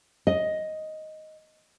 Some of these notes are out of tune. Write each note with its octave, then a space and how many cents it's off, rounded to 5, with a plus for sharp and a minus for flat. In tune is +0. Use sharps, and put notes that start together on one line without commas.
D#5 +5